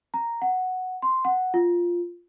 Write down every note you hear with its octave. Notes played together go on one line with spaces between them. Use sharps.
A#5
F#5
C6
F#5
F4